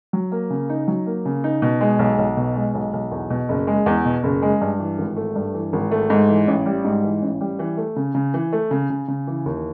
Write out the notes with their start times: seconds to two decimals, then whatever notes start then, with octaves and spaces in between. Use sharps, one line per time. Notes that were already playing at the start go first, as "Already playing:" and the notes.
0.13 F#3
0.32 A#3
0.50 C#3
0.70 D#4
0.88 F#3
1.06 A#3
1.26 C#3
1.44 D#4
1.62 B2
1.81 G#3
1.99 B1
2.18 B1
2.37 B2
2.56 G#3
2.74 B1
2.93 B1
3.12 E2
3.30 B2
3.49 F#1
3.67 G#3
3.86 E2
4.05 B2
4.23 F#1
4.42 G#3
4.61 G2
4.79 E3
4.98 G#1
5.17 A3
5.35 G2
5.54 E3
5.73 G#1
5.91 A3
6.10 G#2
6.29 E3
6.47 A1
6.66 G3
6.85 G#2
7.04 E3
7.22 A1
7.41 G3
7.59 E3
7.77 A3
7.96 C#3
8.15 C#3
8.34 E3
8.53 A3
8.71 C#3
8.90 C#3
9.08 C#3
9.27 E3
9.46 D#2